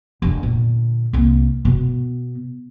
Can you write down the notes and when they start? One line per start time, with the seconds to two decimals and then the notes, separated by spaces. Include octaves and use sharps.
0.22 E1 D3
0.43 A#2 D3
1.13 C2 A#3
1.65 B2 B3